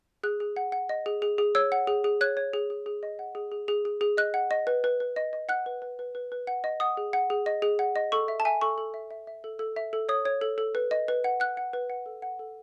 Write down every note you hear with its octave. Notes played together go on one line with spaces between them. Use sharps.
G#4 F#6
G#4
F#5
F#5
D#5
G#4
G#4
G#4
C#5 E6
F#5
G#4
G#4
C#5 F#6
C#5
G#4
G#4
G#4
D#5
F#5
G#4
G#4
G#4
G#4
G#4
D#5 F#6
F#5
D#5
B4
B4
B4
D#5
D#5
F#5 F#6
B4
B4
B4
B4
B4
F#5
D#5
F#5 D#6
G#4
F#5
G#4
D#5
G#4
F#5
D#5
A4 C#6
E5
A5
E5 G#5
A4 C#6
A4
E5
E5
E5
A4
A4
E5
A4
C#5 D#6
C#5
A4
A4
B4
D#5
B4
F#5
F#5 F#6
F#5
B4
F#5
A4
F#5
A4